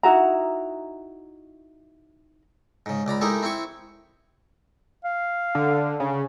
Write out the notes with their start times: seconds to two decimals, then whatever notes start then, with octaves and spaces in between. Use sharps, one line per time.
0.03 D#4 E4 F#4 A#5
2.86 G#2 C#3
3.06 C#2 D5 A#5 B5
3.21 G#3 A3 D#4 E4 G4 A#4
3.43 C4 E4 G5 C#6
5.05 F5
5.55 D3
6.00 C#3